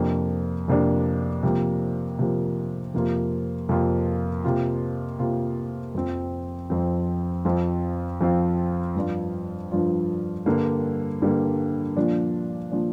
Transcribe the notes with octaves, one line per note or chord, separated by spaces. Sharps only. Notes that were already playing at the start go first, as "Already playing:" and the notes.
Already playing: F2 C3 A#3 D4
F2 C3 A#3 D4
C3 F3 A#3
C3 F3 A#3
F2 C3 A#3 F4
F2 C3 A#3 F4
C3 A#3 F4
C3 A#3 F4
F2 F3 C4
F2 F3 C4
F2 F3 C4 F4
F2 F3 C4 F4
G2 F3 D4 F4
G2 F3 D4 F4
G2 D3 G3 A#3
G2 D3 G3 A#3
A#2 F3 D4
A#2 F3 D4